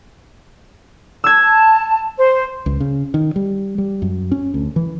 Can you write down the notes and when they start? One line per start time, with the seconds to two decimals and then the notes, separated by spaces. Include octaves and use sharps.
1.24 A5 E6 G#6
2.18 C5
2.66 C#2
2.80 C#3
3.14 D#3
3.36 G3
3.78 G3
4.02 F#2
4.31 C#4
4.54 D2
4.76 E3